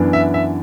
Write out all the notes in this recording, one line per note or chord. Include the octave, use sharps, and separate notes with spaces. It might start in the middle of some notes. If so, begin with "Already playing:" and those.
Already playing: F#2 E3 B3 D4
E5
E5